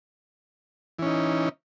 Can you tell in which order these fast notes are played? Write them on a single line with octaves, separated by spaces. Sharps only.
E3 C#4 D#4